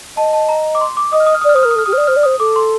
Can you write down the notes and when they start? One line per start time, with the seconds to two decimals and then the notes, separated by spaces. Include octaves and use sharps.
0.17 D#5 A5
0.33 A5
0.49 A#5
0.75 D6
0.81 C6
0.97 D6
1.12 D#5 D#6
1.20 F6
1.26 D#6
1.34 F6
1.41 D#6
1.44 D5
1.49 F6
1.55 C5 D#6
1.63 A#4 F6
1.71 D#6
1.76 A4
1.79 F6
1.86 G4 D#6
1.92 C5 F6
1.98 D5 D#6
2.07 C5 F6
2.16 D5
2.23 C5 D#6
2.40 A4 D6
2.56 C6